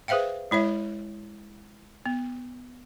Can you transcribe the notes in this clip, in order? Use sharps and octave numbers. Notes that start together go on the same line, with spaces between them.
G#4 B4 C5 E5 F5 G5
G#3 E4 C#5 E5
B3